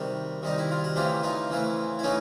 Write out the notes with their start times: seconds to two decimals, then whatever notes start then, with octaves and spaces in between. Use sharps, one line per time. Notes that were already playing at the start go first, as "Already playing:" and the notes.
Already playing: C3 D#3 G3 F#4
0.42 C3 D#3 G3 D#4
0.58 E4
0.71 F4
0.84 F#4
0.96 C#3 E3 A3 C4 F4 G4
1.23 D#4 F4
1.50 C#3 E3 A3 C4
1.99 E4
2.03 C#3 E3 A3 C#4 D#4